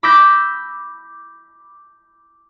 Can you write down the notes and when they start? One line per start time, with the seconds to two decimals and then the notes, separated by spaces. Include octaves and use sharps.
0.03 B5 D6 E6 G6 A#6 B6